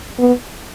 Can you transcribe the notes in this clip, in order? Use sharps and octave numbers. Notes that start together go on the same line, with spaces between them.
B3